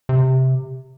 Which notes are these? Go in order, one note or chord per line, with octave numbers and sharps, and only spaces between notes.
C3